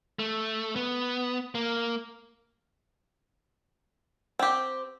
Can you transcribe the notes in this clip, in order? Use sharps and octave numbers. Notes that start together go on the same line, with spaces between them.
A3
B3
A#3
C4 G4